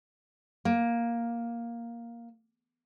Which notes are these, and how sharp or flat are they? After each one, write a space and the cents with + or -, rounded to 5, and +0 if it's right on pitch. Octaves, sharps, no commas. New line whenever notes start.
A#3 +5